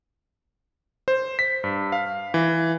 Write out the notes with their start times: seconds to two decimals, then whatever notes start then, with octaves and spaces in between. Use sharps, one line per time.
1.08 C5
1.39 B6
1.64 G2
1.92 F5
2.34 E3